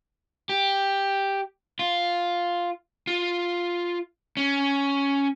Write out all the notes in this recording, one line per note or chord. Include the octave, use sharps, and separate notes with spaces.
G4
F4
F4
C#4